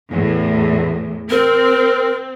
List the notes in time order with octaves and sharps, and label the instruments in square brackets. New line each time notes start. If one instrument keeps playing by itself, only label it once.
[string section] E2 A2
[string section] C4 [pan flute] A#4